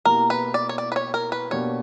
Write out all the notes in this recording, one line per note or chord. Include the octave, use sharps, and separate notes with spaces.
B2 A#3 E4 G4 A#4
B4
D5
C#5
D5
B4
C#5
A#4
B4
B2 A#3 D4 G4 C#5